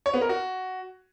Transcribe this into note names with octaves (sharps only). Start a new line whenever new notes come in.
C#5
B3
A#4
F#4